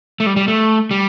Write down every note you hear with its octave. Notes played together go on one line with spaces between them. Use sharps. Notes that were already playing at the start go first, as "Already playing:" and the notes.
A3
G3
G3
A3
G3